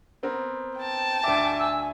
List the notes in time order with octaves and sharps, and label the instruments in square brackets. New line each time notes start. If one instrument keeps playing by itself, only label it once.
[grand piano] B3 C4 A#4
[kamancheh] G5 A5
[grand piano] D2 D4 E5 [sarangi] G#5 [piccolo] D6
[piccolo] E6